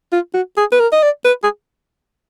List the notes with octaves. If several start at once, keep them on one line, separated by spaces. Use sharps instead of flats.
F4
F#4
G#4
B4
A#4
D#5
D5
B4
G#4